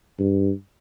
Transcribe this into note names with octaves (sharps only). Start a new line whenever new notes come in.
G2